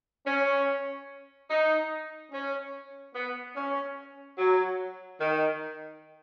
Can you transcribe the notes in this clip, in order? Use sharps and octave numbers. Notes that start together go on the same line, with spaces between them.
C#4
D#4
C#4
B3
C#4
F#3
D#3